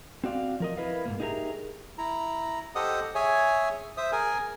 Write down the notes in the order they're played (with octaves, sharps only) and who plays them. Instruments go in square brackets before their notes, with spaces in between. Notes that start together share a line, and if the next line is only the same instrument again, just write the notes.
[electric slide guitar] C4 F#4 D5 F5
F3 A#4 D#5
E4 A#4 B4 D#5 F5
G#2 B2 A#3
D#4 G4 G#4 A#4 E5 A#5
[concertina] E4 A#5
G4 A4 C5 D#5 F#5 D#6
G#4 C#5 E5 G#5
C5 E5 D#6
G#4 A#4 G#5